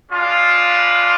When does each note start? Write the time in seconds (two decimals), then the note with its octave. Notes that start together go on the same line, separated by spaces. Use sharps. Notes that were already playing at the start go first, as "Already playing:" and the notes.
0.11 G#3 D4 F4
0.66 B4